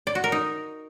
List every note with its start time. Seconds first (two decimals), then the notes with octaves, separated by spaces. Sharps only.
0.07 D5
0.15 F#4
0.24 A#4
0.32 D#4